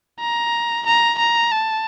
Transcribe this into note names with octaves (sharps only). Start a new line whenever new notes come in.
A#5
A#5
A#5
A5